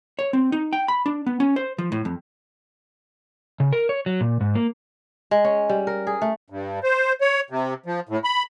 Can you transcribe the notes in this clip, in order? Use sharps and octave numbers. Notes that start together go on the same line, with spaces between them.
C#5
C4
D#4
G5
B5
D4
B3
C#4
C5
F3
A2
F2
C#3
A#4
C#5
F#3
A#2
G#2
A#3
G#3
C#4
G3
A#4
G#4
A3
G2
C5
C#5
C3
F3
A2
B5